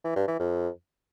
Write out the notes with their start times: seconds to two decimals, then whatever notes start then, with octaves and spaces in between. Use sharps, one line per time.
0.04 E3
0.16 G2
0.28 E3
0.39 F2